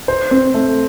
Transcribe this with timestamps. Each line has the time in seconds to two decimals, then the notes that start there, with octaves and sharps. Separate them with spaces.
0.08 C5
0.31 C4
0.54 A3